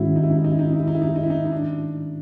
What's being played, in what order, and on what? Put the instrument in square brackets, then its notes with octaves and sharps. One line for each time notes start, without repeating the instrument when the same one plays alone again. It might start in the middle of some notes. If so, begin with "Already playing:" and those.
Already playing: [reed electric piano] G#2 D#3 G#3 C#4 F#4 [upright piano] E4
[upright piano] D#4
E4
D#4
E4
D#4
E4
D#4
E4
D#4
E4
D#4
E4
D#4
E4
D#4
E4
D#4
D#4
D4